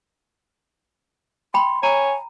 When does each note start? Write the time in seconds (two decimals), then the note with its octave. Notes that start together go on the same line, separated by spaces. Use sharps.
1.54 G5 B5 C6
1.83 C#5 G#5 A#5